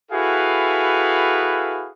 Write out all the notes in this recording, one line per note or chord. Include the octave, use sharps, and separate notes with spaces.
E4 F#4 G#4 A4 B4 F5